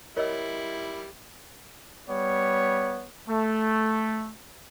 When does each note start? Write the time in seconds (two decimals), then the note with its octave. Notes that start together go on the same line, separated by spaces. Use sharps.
0.17 G3 E4 A#4 C#5 D#5 E6
2.08 G3 B3 C#5
3.28 A3